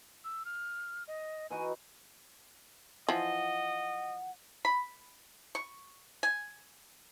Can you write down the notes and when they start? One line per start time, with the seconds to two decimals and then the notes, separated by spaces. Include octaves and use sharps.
0.24 E6
0.45 F6
1.08 D#5
1.50 E3 D#4 F#4 G#5
3.08 E3 F3 D#5 F#5
4.65 B5
5.55 C#6
6.23 G#5